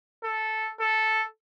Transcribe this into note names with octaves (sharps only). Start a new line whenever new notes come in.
A4
A4